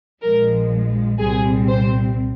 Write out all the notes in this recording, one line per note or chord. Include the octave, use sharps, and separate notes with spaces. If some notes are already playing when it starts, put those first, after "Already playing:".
A#1 A#2 F3 G#3 A#4
C2 A#2 G3 C4 G#4
C5